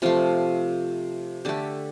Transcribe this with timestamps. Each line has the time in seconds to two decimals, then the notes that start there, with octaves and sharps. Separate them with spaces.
0.02 C3 F3 A3 F4
1.45 D3 A3 G4